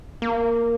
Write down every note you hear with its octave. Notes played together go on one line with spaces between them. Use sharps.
A#3